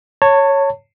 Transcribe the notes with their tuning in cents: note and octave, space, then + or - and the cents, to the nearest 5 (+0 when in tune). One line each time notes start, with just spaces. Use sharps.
C#5 +0 A5 +30